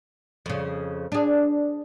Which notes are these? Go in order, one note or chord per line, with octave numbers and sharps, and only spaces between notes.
F2 C#3
D4 G#4